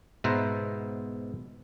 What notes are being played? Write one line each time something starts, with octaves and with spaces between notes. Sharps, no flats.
G#2 B2 B4 C5 E5 A#5